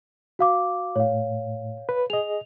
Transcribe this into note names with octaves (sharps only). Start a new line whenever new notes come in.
F#4 F5 D6
A2 C#5 F5
B4
G#4 D#5 F7